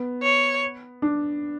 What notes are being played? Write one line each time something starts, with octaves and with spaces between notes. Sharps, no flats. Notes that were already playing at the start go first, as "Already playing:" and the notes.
Already playing: B3
C#5
D4